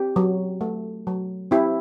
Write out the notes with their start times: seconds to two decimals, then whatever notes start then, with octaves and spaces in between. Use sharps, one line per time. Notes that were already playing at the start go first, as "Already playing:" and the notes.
Already playing: C4 G4
0.16 F#3
0.61 A3
1.07 F#3
1.51 C4 E4 G4